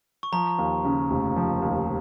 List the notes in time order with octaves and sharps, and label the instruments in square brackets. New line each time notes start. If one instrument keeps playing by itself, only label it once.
[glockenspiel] C#6
[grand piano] F3 [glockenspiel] A#5
[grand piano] D#2
C#3
F1
F3
D#2